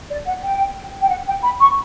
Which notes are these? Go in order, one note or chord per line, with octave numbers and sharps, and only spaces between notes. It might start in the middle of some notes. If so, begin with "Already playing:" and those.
D5
F#5
G5
G5
F#5
G5
B5
C#6